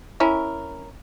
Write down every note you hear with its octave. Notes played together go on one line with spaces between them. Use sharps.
C#4 E4 A#4